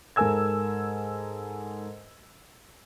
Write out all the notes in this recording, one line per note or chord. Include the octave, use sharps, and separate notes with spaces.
G#2 A4 A#4 G#5 E6 G#6